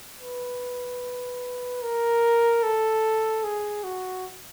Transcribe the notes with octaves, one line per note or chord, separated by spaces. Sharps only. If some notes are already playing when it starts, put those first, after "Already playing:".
B4
A#4
A4
G#4
F#4